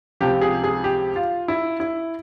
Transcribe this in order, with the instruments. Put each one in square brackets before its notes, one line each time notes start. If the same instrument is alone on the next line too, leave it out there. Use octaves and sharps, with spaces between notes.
[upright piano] C#2 C3 F3 G4
G#4
G#4
G4
F4
E4
E4